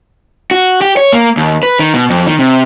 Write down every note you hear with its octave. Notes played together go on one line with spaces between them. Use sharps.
F#4
G4
C#5
A#3
D#2
B4
D#3
B2
F2
D#3
C3